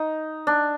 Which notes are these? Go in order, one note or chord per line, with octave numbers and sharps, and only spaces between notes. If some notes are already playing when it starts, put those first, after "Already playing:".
Already playing: D#4
D4